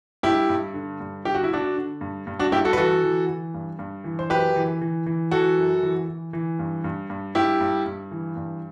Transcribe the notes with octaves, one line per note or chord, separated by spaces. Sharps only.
G2 E4 G4
G2
D3
G2
D3 G4
F#4
E4
D3 D4 F#4
D3
G2
G2
D4 F#4
G2 E4 G4
F#4 A4
B4
E3 F#4 A4
E3
E3
G2
G2
E3
C5
F#2 G4 B4
E3
E3
E3
E3 F#4 A4
F#2
E3
E3
E3
G2
G2
G2
G2 E4 G4
G2
G2
E3
G2